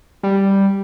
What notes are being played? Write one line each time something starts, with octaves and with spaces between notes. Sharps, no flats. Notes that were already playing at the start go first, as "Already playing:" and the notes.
G3